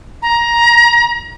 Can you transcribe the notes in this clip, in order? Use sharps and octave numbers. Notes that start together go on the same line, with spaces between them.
A#5